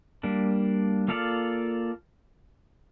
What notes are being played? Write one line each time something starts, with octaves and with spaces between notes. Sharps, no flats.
G3 A#3 D4
A#3 F4 A4 D5 F5